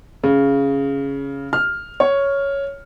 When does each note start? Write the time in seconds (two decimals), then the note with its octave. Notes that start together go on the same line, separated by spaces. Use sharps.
0.24 C#3
1.53 F6
2.00 C#5